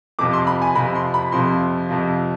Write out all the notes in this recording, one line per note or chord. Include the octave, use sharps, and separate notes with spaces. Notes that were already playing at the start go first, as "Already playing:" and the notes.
F2 C3 F3 D6
C6
B5
G#5
F2 C3 F3 B5
C6
B5
F2 C3 F3 C6
F2 C3 F3